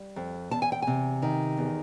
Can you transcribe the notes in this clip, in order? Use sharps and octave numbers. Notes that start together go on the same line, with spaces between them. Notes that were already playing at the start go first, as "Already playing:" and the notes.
Already playing: G3
F2
E2 A5
G#5
G5
C3 G#5
D#3
E2